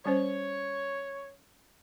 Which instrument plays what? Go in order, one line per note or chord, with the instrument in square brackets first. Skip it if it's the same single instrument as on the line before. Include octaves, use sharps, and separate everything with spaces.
[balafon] G3 C#4 C5 [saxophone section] C#5